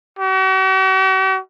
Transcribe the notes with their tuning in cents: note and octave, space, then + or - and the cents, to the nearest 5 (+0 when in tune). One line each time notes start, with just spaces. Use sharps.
F#4 +45